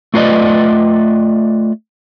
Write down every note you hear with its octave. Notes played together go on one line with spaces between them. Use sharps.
A3 F4 B4 D5 D#5